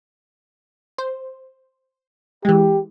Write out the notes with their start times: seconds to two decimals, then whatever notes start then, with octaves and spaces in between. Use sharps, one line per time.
0.98 C5
2.45 E3 G#3 G4